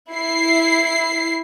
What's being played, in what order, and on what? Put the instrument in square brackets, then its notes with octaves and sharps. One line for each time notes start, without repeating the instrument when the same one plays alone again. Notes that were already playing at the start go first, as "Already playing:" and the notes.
[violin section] E4 C7